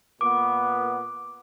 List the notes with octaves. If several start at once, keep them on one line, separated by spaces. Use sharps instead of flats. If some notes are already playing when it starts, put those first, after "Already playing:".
A#2 B3 D6